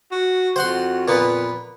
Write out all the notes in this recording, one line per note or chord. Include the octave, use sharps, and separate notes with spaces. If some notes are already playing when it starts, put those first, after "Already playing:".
F#4
F2 F#4 C5 F#5 C6
A#2 A#3 B3 B4